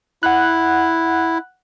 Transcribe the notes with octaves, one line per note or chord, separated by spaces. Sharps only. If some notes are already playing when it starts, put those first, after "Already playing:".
E4 F#5 F#6